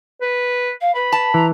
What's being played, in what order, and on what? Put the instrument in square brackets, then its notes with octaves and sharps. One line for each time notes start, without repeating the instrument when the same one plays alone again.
[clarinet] B4
[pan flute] F5
[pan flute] B4 [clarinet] B5
[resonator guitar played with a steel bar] A5
[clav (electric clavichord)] E3 [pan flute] A#5